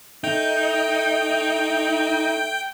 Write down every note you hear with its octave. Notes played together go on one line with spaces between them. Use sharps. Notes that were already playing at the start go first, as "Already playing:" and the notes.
A3 D#4 G5